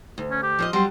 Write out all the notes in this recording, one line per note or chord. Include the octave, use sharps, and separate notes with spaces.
D2
C#4
G4
F3 C#5 D#5
F#3 G3 C6